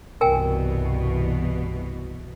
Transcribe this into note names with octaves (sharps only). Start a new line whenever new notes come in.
C2 G2 B2 E3 A#4 G5 G#5